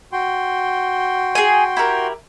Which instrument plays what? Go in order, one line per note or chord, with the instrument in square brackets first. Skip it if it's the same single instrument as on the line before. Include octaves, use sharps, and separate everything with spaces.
[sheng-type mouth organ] F#4 G5 C6
[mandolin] G#4 G#5
E4 G4 A#4